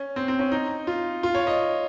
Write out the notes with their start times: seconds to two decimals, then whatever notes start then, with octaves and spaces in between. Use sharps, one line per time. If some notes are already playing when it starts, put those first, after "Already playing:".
Already playing: C#4
0.16 C4
0.28 C4
0.39 C#4
0.52 D#4
0.87 F4
1.23 F4
1.35 C#5
1.47 D#5